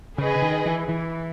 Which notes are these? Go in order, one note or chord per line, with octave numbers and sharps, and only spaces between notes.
C#3 G#4 B4 D#5
C#3
D#3
E3
E3